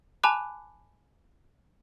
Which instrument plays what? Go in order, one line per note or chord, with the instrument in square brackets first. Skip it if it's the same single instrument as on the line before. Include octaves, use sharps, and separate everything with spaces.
[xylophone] G#5 A5 B5 D6 F#6